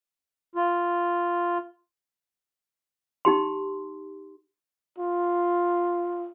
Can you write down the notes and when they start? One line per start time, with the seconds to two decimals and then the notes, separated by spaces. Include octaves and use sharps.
0.56 F4
3.25 D#4 G4 C6
4.98 F4